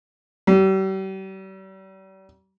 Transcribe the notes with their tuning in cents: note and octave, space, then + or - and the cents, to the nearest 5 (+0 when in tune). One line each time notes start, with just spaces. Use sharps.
G3 -40